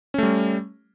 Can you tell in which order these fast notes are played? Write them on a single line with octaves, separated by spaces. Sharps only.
C#4 A3 G3